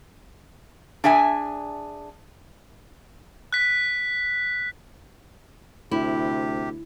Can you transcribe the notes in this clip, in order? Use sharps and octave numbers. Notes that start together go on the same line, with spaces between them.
D4 G#4 E5 G#5
F#6 B6
D2 C3 E4 G4